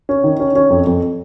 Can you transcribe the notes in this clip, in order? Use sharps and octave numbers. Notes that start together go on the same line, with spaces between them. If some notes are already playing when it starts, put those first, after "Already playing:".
C#4
D#3
C#4
C#4
F2
F2